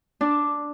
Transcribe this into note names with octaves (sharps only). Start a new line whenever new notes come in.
D4